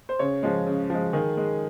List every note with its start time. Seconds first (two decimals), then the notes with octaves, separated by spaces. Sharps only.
0.09 C5
0.19 C#3 C#5
0.43 F3 G#3
0.66 C#3
0.90 F3 G#3
1.13 D#3 G#4
1.37 G#3